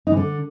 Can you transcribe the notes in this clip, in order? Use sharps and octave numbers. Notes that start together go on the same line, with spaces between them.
D#4
E3
D3